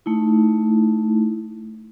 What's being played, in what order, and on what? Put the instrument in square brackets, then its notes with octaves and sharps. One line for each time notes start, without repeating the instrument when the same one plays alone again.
[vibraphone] A3 D#4 E4